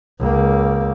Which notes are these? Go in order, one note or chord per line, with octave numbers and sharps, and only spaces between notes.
C#2 A#3